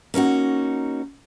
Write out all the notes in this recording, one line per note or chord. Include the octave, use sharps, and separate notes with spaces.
A#3 C#4 D#4 F#4